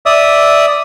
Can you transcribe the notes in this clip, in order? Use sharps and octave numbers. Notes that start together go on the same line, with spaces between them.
D5 E5 D#6